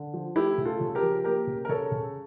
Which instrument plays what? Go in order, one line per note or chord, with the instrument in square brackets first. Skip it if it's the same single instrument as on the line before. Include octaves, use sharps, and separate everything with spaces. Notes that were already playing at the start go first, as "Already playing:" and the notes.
Already playing: [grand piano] D3
F3
A3 E4 G4
C#3
F4 A4
C#3
G4 A#4
F3
A#3 G4 A#4
C#3
A#4
C#3 A4 C#5
C#3